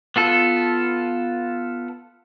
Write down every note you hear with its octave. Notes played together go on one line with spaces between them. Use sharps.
B3 F4 A4